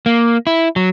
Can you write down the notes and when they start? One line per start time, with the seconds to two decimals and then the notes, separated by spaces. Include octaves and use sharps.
0.06 A#3
0.47 E4
0.76 F#3